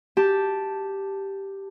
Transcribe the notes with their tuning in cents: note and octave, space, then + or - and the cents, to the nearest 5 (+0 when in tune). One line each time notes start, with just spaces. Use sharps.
G4 +0 A5 +0